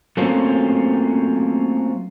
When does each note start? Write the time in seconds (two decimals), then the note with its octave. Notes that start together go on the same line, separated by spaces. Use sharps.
0.17 F#3 A3 A#3 C4 C#4 F4